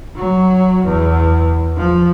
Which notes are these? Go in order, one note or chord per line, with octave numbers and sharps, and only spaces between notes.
F#3
E2
F3